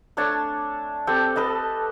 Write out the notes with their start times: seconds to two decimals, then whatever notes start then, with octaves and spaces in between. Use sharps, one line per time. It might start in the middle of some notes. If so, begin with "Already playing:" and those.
0.17 A3 D4 C#5 A5
1.07 C4 G4 A4 G5
1.36 A4 B4 D#5 A5